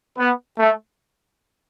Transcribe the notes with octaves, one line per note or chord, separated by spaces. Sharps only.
B3
A3